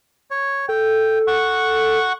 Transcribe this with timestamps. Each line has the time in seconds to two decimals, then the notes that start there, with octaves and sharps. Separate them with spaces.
0.31 C#5
0.69 A4 G5
1.27 F#5 C#6